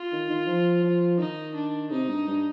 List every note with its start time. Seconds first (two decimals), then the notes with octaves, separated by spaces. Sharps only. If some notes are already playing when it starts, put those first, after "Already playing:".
Already playing: F4
0.12 D#3
0.30 D#3
0.47 F3
0.83 F3
1.19 D#3 D#4
1.55 D4
1.91 C3 D#4
2.09 G2
2.27 G2